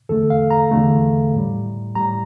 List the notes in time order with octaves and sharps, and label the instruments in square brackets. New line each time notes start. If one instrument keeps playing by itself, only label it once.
[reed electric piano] E2 D3 A3 A4
F5
A#5
E2 D3 A3
A2 G3
A2 G3 A#5